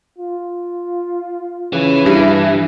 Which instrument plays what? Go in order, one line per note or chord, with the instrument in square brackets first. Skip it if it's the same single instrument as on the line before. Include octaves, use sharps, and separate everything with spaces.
[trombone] F4
[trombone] C#3 [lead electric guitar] E3
[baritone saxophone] G2 [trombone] E4